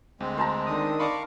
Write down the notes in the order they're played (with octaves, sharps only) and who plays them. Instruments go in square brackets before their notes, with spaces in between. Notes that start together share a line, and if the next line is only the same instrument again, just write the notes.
[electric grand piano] D2 [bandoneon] G#3 C4
[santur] C5 A5 A#5
[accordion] D3 D#3 D#6
[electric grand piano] D5 A5 B5 [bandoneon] F5 C#6 D6